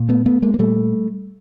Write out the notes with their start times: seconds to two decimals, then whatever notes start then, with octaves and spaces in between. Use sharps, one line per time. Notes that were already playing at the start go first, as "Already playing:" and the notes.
Already playing: A#2
0.09 A3 B3
0.26 A3 B3
0.42 G#3 A#3
0.54 A#3
0.59 A#2 G3 A3